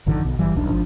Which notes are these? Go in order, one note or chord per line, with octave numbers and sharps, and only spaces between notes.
G#1 F2 D3 D#3
B1 B2
G1 E3 G3
D#1 B1 D4
G#1 F3 D4